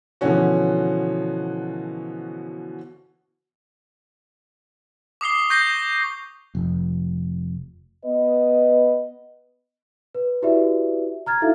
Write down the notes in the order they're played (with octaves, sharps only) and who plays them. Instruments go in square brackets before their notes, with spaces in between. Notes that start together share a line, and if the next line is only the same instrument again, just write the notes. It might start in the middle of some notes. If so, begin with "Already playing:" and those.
[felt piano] B2 D3 E3 F3 C#4 F#4
[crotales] D6 D#6 C7 G7
C#6 G6 A#6 C7 G7
[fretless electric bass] F1
[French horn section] B3 B4 D#5
[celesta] B4
E4 F#4 G4 B4 D5 E5
A#5 F6 G#6 A6
D#4 E4 F#4 A4 E5 F5